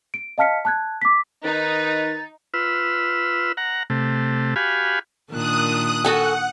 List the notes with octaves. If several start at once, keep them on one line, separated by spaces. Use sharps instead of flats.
D7
D#5 F5 A5 F6 B6 C#7
A5 F#6 G#6
D6 B6
D#3 D#4 B4 A6
F4 B4 E6
F#5 A#5
C3 A3
F#4 G4 F5 G#5 B5
A#2 D#3 D4 D#6 F#6
F#4 A4 F#5 G#5